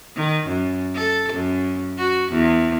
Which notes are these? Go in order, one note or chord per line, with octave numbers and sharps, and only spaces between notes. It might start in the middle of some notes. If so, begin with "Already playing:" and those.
D#3
F#2
A4
F#2
F#4
E2